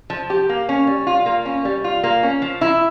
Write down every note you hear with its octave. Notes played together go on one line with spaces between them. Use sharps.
F3
G4
A#3
C#4
G3
F4
A#3
C#4
G3
F4
A#3
C#4
F3
E4